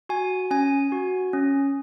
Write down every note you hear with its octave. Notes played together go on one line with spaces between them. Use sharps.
F#4 G#5
C#4 G#5
F#4
C#4